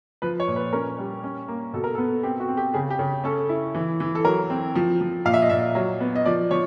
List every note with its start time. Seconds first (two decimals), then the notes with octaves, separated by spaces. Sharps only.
0.22 F3 B4
0.40 C#5
0.48 A#2
0.56 B4
0.73 C#4 A#4
0.98 G3
1.24 C#4
1.48 A#3
1.73 B2 A4
1.84 A#4
1.95 B3 A4
2.23 C4 G4
2.40 F#4
2.48 C4
2.57 G4
2.74 C#3 G#4
2.90 G4
2.99 C#3
3.24 C#4 A4
3.49 E4
3.74 E3
4.00 E3
4.15 A4
4.24 F#3 A#4
4.50 C4
4.75 F3
5.01 F3
5.25 A#2 F5
5.34 E5
5.42 D#5
5.49 A#2 E5
5.75 F#3
6.00 B3
6.16 D#5
6.26 F3 D5
6.51 F3 C#5